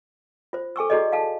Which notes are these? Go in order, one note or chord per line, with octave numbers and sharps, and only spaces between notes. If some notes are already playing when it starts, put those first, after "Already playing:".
F4 C5
A4 G#5 C#6 E6
E4 F#4 G#4 A4 D5 D#5
F5 A5